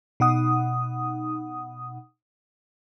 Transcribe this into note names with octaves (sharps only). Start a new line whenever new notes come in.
B2 D#4 F#5 D#6